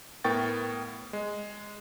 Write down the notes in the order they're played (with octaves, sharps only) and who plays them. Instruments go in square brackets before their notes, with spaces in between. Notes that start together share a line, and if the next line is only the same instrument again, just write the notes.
[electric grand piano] A2 B3 A#4 G5 C#6 A6
G#3